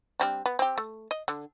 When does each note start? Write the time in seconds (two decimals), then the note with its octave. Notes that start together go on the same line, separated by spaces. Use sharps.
0.20 G3 C4 D4
0.46 B3
0.59 C4 G4
0.78 A3
1.11 D#5
1.28 D3